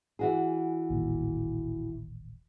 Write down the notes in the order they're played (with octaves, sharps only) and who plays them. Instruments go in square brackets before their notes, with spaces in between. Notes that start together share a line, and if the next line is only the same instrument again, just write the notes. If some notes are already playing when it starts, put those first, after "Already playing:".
[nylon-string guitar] E3 F#4 G#4
[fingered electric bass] D#1 A1 D#2